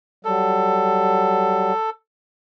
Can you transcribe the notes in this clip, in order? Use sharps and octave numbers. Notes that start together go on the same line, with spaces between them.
F#3 G3 A4